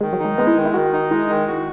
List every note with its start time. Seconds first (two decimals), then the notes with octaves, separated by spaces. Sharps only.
0.01 D#3 G#3
0.13 F#3
0.19 D#4
0.25 G#3
0.38 G#3 B3
0.47 E4
0.56 D#3
0.65 E4
0.74 D#3 F#4
0.93 D#4
1.10 G#3 E4
1.29 D#3
1.47 F#4